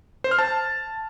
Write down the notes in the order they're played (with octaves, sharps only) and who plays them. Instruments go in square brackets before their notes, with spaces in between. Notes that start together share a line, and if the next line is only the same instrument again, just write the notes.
[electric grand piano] C5
F6
A5